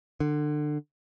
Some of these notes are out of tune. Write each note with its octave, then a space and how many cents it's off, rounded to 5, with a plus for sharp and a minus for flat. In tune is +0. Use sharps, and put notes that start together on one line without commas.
D3 +25